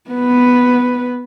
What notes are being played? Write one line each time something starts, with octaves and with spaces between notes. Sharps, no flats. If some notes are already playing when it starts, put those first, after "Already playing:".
B3 B4